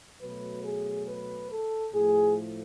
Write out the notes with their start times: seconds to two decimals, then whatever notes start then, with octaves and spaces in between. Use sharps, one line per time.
0.22 B2 F#3 A3 B4
0.65 G#4
1.09 B4
1.52 A4
1.95 A2 F3 A3 G#4